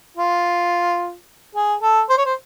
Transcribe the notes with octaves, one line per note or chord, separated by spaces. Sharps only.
F4
G#4
A4
C5
C#5
C5